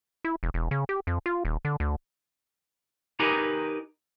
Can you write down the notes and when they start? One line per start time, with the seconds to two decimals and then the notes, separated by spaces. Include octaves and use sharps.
0.25 E4
0.43 E1
0.54 E1
0.71 C#3
0.89 G4
1.07 F2
1.26 F4
1.45 D#1
1.65 D3
1.80 D2
3.20 D#4 G4 A#4 B4 G#5 A#5